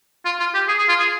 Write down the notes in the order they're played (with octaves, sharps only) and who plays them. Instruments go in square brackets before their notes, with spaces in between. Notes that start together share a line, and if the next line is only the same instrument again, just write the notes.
[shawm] F4
F4
G4
G#4
G#4
F4
G#4